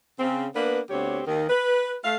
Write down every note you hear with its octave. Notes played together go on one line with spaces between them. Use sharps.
C#3 C4
A#3 B3 D4 B4
D2 B3 C4 G4 C#5
D#2 D#3
B4
A3 F5